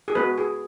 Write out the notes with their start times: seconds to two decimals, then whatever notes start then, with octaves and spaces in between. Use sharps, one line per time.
0.08 G#4
0.15 G#3 B3 F#4 B4
0.38 G#4